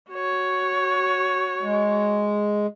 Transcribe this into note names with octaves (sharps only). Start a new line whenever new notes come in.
F#4 C#5
G#3